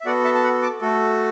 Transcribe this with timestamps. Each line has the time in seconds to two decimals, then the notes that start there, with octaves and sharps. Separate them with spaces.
0.01 E5
0.06 B3 F#4 A4 D5 F#5
0.24 E5 A5
0.34 A5
0.43 F#5 B5
0.62 A5 D6
0.81 A3 F#4 A4